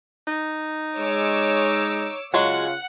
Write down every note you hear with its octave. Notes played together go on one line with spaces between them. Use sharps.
D#4
G#3 C#5 D6 E6
C#3 F#3 G#3 F4 G#4 F#5